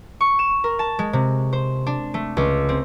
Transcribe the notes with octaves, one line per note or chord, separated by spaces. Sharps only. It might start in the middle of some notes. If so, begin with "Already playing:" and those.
C#6
E7
A#4
A5
G#3
C3
C5
D4
A3
C#2
C4